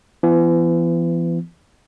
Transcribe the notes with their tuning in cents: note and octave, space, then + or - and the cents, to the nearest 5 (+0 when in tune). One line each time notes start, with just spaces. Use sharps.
E3 +40 B3 +25